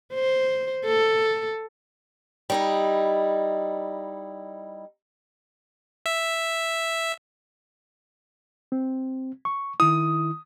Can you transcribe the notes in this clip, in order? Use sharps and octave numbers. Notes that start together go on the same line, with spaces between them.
C5
A4
G3 D#4 E4
E5
C4
C#6
D#3 E4 D#6